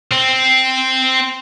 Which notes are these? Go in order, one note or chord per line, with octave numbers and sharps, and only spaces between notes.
C4